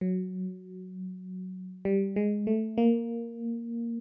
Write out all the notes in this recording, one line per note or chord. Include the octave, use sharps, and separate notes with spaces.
F#3
G3
G#3
A3
A#3